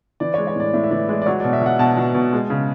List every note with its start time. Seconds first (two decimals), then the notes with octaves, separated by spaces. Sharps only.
0.20 E3 D5
0.34 G#3 C#5
0.47 C#5
0.56 A2 D5
0.73 A2 E5
0.84 E5
0.91 E3 D5
1.09 G#3 D5
1.22 D5
1.26 F#3 C#5
1.40 B2 D5
1.53 E5
1.62 F#3 F#5
1.79 B2 A5
1.97 F#3
2.15 B2
2.33 G#3
2.50 C#3